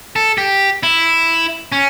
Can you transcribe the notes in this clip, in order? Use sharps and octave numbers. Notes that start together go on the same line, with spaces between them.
A4
G4
E4
C#4